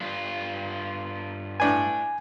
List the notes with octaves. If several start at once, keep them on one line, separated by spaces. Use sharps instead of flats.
G2 F4
A2 D4 B4 G#5